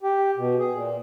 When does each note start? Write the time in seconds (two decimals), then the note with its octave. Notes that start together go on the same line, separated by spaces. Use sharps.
0.03 G4
0.37 B2
0.58 G#4
0.74 A#2